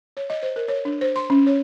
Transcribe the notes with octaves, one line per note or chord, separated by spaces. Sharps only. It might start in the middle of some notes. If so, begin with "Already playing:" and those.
C#5
D#5
C5
A#4
C#5
D4
C5
C6
C#4
C#5